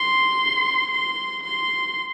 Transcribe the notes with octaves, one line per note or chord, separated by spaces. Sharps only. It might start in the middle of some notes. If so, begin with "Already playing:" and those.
Already playing: C6
C6
C6